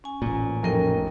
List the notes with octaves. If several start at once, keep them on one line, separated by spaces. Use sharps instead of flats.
C#4 G#5
A1 A#2
F1 C#4 A#4 G5 D#7